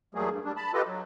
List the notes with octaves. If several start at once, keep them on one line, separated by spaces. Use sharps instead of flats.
E2 F#3 G3 A3 A#3 G#4
G2
G3 D4
A5 B5
F4 G4 A4 B4 D#5
F#3